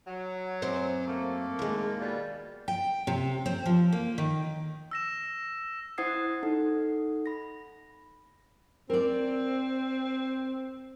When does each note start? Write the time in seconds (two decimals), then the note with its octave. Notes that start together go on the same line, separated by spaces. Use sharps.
0.07 F#3
0.62 F#2 C4 C5
1.07 A3 A#3
1.59 D#2 G#3
2.01 B2 G3 F4
2.68 G5
3.07 C3
3.46 C4
3.66 F3
3.92 A#3
4.18 D#3
4.91 E6 A#6 E7
5.98 E4 C5 F#5 D#6 G#6 C7
6.43 D#4 A4 F#5
7.26 B5 A#6
8.90 C4 A#4 D5